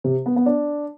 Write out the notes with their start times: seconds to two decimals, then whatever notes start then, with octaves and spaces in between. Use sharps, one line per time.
0.04 C3
0.26 B3
0.36 B3
0.46 D4